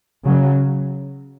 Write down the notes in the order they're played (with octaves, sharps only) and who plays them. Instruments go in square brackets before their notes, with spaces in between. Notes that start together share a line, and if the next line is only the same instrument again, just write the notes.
[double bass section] C#3 F#3